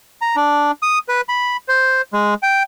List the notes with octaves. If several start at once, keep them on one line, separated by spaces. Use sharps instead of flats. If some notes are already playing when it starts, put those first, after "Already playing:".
A#5
D4
D#6
B4
B5
C5
G#3
G5